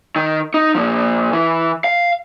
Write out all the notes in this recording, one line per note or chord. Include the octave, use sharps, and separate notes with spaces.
D#3
D#4
A#2 F3
E3
F5